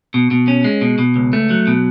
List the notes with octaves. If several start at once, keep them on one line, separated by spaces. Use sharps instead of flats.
B2
B2
C#4
G#3
B2
B2
C#2
A3
F#3
B2